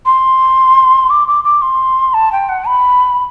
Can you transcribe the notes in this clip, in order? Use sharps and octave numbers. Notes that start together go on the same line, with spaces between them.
C6
D6
D6
D6
C6
A5
G5
F#5
B5